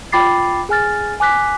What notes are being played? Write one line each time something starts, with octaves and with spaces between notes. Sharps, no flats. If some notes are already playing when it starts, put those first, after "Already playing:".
F4 G5 B5 D6 A6 C7
G#4 G#5 F6 A6
G#5 D6 F#6 B6